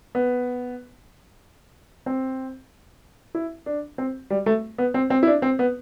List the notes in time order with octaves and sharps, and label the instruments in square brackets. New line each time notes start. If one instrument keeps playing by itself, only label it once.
[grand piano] B3
C4
E4
D4
C4
G3
A3
B3
C4
C4
E4
D4
C4
B3